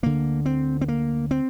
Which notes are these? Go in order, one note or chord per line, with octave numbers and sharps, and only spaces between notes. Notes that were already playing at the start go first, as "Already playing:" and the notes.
D2 D3 A#3
C4
C4
A#3
C4